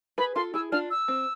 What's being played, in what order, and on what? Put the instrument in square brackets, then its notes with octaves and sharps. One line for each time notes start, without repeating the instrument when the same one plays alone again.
[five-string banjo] G#4 B4 [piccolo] B5
[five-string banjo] F4 A4 [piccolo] C6
[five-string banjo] E4 G#4 [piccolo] E6
[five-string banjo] D4 F4 [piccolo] F6
[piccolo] E6
[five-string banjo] C4